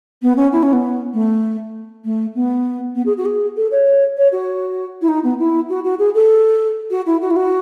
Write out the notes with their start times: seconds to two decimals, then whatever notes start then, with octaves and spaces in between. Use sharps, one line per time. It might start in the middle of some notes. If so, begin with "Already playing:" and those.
0.22 B3
0.36 C#4
0.52 E4
0.63 C#4
0.73 B3
1.13 A3
2.05 A3
2.35 B3
2.95 B3
3.06 G#4
3.17 F#4
3.25 G#4
3.57 A4
3.71 C#5
4.17 C#5
4.32 F#4
5.02 E4
5.08 D#4
5.24 B3
5.39 E4
5.69 F#4
5.84 F#4
5.99 G#4
6.15 A4
6.90 F#4
7.06 E4
7.21 F#4
7.31 E4
7.36 F#4